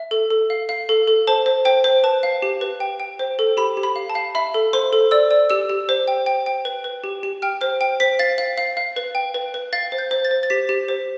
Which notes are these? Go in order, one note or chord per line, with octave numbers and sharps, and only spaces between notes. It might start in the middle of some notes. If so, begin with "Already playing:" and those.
Already playing: E5
A4
A4
F5
F5
A4
A4
C5 A5
C5
C5 G5
C5
B4 A5
F5
G4
B4
G5
G5
C5
A4
G4 B5
G4
B5
F5
A5
F5
E5 B5
A4
C5 C6
A4
D5 E6
D5
G4 E6
G4
C5
G5
G5
G5
B4
B4
G4
G4
G5 F6
C5 F6
G5
C5 B6
F5 A6
F5
F5
F5
B4
G5
B4
B4
F5 A6
C5
G6
C5
A6
C5
A6
G4 B6
G4
C5